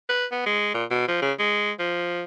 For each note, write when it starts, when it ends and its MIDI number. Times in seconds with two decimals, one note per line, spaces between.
0.09 0.25 71
0.31 0.42 59
0.46 0.73 56
0.74 0.84 46
0.90 1.06 47
1.08 1.18 53
1.22 1.32 49
1.39 1.71 56
1.79 2.24 53